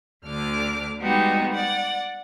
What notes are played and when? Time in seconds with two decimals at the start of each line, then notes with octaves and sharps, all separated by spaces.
0.25 D2 D3 D6 F6
0.99 G3 G#3 B3 D#4 F#4 G4
1.52 D5 F#5